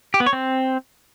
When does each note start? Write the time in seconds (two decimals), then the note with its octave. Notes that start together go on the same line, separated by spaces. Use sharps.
0.14 G4
0.20 B3
0.26 C#5
0.33 C4